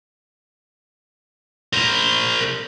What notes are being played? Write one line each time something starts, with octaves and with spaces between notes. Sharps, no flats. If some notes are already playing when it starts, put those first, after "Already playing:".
A#4 C5